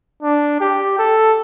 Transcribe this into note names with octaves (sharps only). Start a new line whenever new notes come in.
D4
G4
A4